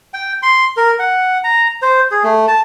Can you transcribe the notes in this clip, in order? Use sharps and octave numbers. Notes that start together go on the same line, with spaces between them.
G5
C6
A#4
F#5
A#5
C5
G#4
A3
A5